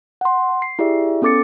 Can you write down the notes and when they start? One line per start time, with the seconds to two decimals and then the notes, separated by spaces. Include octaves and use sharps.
0.21 F#5 C6
0.62 C7
0.79 E4 G4 G#4 D5 E5
1.22 B3 C#4 A4 D6 A6 C#7